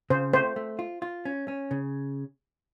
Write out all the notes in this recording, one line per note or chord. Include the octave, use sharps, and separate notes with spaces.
C#3 C5
A3 C5
A3
F4
F4
C#4
C#4
C#3